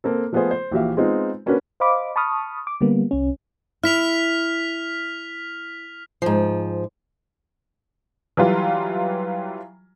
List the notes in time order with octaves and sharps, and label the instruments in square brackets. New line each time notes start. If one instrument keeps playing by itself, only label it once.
[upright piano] A#3 C4 A4
F3 A3 B3 F4 G#4 C5
C5
A#1 E3 F#4 G4 E5 F5
G#3 B3 C4 D#4 F4
A#3 C#4 D4 F#4 A#4 B4
[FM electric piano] C5 D#5 F5 B5 D6
A5 B5 C#6 D#6 F6
D6
D3 G3 A#3 B3
C2 C#4
[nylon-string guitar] E4 [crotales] F6 B6 F7
[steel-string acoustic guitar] G#2 F3
[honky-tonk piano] E3 F#3 G3 F4